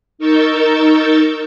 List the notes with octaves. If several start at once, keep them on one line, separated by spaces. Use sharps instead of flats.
D#4 A#4 C#6 E6 G6 A6